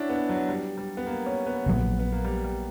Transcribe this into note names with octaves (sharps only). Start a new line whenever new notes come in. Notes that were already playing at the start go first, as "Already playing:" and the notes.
Already playing: C#4 D4 E4 F#4
B3
F#3
G3
G3
B3
A#3
C#4
B3
A#1 A#2 F#3
B3
A#3
G3
G3